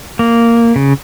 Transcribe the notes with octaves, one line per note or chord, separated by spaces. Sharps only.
A#3
C#3